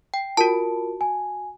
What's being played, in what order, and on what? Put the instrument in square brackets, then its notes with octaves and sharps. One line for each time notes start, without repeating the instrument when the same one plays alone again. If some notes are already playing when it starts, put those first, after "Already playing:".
[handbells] G5
[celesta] F4 A#4 [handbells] F#4 A5
[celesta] G#5